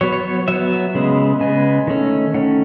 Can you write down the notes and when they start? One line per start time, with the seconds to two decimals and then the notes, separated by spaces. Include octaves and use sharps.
0.01 F#3 B3 C#5
0.12 C#5
0.24 C#5
0.48 F#3 B3 E5
0.95 C#3 G#3 B3
1.40 C#3 G#3 B3 G#5
1.87 D#3 A3 C#4
2.34 D#3 A3 C#4 F#5